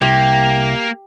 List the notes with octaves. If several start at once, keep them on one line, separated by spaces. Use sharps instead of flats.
C2 A#3 G4